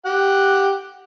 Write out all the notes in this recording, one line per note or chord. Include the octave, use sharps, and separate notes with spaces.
G4 F#5